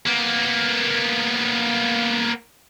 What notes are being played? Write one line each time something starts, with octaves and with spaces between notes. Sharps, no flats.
A#3 B3